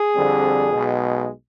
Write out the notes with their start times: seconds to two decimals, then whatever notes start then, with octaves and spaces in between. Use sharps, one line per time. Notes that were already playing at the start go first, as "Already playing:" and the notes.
Already playing: G#4
0.15 F2 D3 G3 C4
0.71 B1 B2 G#3